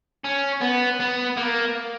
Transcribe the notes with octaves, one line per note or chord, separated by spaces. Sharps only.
C#4
B3
B3
A#3